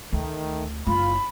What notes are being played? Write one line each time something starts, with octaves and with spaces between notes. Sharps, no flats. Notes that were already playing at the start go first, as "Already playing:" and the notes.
D2 D#3 A3
F#1 F4 B5